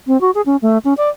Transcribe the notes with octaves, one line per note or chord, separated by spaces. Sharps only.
C4
F#4
G#4
C#4
A3
C#4
D5